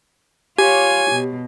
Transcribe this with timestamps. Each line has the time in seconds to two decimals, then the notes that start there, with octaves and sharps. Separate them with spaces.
0.58 F4 G4 C#5 G#5
1.11 B2